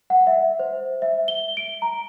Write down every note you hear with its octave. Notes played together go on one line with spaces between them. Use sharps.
F#5
E5
C5
E5
G7
D7
A#5